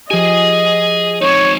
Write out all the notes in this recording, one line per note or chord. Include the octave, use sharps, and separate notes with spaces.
F3 G4 G#4 D#5 G#5
C4 D#4 C#5